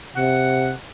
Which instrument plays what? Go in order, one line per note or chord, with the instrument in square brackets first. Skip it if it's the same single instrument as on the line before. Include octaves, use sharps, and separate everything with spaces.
[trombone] C3 [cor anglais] F#5